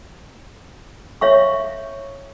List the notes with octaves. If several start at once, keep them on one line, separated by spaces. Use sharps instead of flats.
C#5 E5 F5 C#6